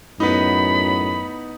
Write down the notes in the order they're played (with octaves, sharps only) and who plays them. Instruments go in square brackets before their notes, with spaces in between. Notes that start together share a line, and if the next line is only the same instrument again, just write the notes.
[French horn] F#2 [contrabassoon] A2 [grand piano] B3 D#4 [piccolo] B5